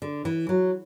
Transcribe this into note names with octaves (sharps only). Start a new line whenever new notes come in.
D3
E3
F#3